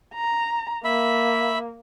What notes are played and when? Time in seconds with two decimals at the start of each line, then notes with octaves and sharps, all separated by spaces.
0.14 A#5
0.84 A#3 E5 B5